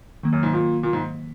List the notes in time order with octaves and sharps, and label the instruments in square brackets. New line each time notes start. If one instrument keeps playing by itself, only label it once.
[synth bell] D#3 F#3 A#3
[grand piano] F#2
G#2
A#2
A#2
G#2